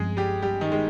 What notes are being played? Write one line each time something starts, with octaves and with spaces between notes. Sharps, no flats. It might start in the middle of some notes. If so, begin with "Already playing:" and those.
Already playing: G2 F3 G#3 C4 G#4
G3 G4
G3 G4
D#3 D#4
G#3